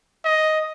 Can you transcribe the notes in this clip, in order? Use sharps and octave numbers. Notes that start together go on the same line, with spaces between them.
D#5